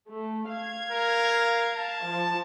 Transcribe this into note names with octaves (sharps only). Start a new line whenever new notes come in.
A3
F5 G#6
A#4
A5
F3